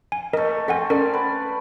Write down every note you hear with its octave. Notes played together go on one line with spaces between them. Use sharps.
G#5
A3 A#3 A#4 D#5
C4 A4 F#5 G#5
C#4 A4 A#4 D5 F5
B4